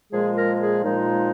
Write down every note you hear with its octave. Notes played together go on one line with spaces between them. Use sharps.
A#2 F3 G#3 G#4
A#4
G#4
A#2 F3 G#3 D#4